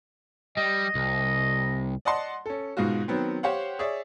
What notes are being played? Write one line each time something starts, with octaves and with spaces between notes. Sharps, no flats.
G3 D#5
C2
D5 D#5 F#5 A5 C6
C#4 A4
G#2 B2 G#3 F4 F#4
D#3 F#3 B3 C4
G4 C5 C#5 F5 F#5
G#4 C#5 D5 E5